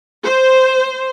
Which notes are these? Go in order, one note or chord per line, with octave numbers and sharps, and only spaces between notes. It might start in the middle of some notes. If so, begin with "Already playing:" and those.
C5